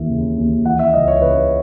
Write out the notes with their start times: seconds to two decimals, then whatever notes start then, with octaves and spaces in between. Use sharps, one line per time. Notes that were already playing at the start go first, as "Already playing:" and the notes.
Already playing: D#2 E3 E5
0.09 C#3
0.38 D#2
0.65 E3 F#5
0.79 E5
0.94 C#2 D#5
1.08 C#5
1.22 C#3 B4